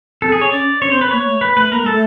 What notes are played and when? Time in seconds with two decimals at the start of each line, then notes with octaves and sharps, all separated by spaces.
0.22 C4 A4
0.32 G#4
0.41 C#5
0.52 C#4 D5
0.82 C#4 C#5
0.91 C4 C5
1.01 B4
1.11 A#3 C#5
1.27 A3
1.41 B4
1.56 A3 B4
1.71 A#3 A#4
1.82 G#3
1.86 A4
1.91 A3